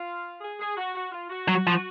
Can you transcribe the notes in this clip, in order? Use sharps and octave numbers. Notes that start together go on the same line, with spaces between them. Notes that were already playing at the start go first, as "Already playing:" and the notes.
Already playing: F4
G#4
G#4
F#4
F#4
F4
F#4
F#3
F3